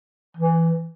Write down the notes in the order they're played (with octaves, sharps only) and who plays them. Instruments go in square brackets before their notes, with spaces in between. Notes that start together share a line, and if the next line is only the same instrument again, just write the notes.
[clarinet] E3